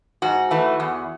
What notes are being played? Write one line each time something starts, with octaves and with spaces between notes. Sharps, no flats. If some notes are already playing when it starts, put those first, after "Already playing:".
G#2 F#4
E3 A3
E2